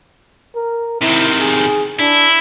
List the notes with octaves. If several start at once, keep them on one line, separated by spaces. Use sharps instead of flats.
A#4
C3 D#3 E4
G#4
D4 E4